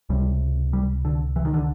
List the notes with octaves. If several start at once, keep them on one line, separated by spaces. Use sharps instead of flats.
C#2 C3 G3
G3
D3
E3
D#3
D3